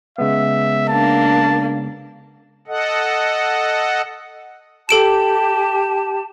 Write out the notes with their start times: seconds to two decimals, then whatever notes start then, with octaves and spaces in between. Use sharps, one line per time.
0.18 C#3 G#3 B3 E5
0.88 A#3 D4 A5
2.68 A4 D#5 F#5
4.89 G4 A4 A5 D7 E7